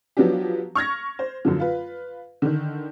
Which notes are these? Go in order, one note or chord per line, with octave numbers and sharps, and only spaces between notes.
F3 F#3 B3 D4 G4
C#6 F6 G#6 A#6
C5
F#2 D3 F3
F4 B4
D3 D#3